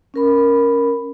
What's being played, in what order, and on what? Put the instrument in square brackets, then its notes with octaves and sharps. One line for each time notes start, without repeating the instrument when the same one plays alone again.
[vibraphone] C#4 A#4 B5